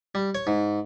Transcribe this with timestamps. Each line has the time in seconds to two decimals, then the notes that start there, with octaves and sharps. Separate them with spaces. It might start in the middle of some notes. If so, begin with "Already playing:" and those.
0.15 G3
0.35 C#5
0.47 G#2